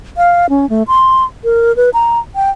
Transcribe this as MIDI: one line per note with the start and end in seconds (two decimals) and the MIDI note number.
0.17 0.46 77
0.50 0.69 61
0.70 0.83 57
0.88 1.24 84
1.44 1.75 70
1.76 1.90 71
1.94 2.19 82
2.36 2.50 79